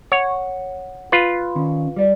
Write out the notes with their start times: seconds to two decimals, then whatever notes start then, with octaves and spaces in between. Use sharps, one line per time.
0.12 C#5 F#5
1.12 F4 B4
1.55 D#3 C#4
1.96 G3 D5